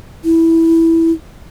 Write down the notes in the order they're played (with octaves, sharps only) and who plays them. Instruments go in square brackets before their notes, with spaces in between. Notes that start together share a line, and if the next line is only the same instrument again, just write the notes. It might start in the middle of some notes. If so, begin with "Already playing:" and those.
[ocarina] E4